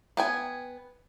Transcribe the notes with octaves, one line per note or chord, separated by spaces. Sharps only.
B3 G5 G#5